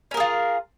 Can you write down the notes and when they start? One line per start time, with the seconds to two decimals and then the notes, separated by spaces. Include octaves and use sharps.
0.11 C#4
0.14 A#4
0.17 G#4
0.20 F4